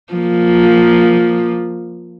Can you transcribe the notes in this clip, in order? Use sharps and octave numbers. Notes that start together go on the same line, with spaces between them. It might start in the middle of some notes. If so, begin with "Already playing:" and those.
F3 A#3